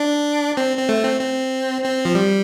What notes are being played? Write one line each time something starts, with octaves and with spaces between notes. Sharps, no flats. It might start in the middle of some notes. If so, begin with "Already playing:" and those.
Already playing: D4
C4
C4
A3
C4
C4
C4
F3
G3